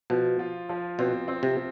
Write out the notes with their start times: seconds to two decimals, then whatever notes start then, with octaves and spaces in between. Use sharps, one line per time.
0.10 B2 F3
0.39 F4
0.69 F3
0.99 B2 C4
1.28 C4
1.43 C3